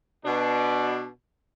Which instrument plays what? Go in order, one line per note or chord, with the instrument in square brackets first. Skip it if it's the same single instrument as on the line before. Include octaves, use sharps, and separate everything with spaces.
[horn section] B2 D4